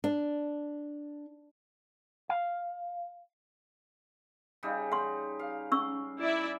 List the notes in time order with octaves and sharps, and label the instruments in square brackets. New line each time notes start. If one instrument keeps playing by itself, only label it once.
[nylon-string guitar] D4
[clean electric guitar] F5
[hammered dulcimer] C#3 G3 D#4
[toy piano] F#5 C6
[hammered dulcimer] F5
[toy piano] C#4 C#6 E6
[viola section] E4 D5 E5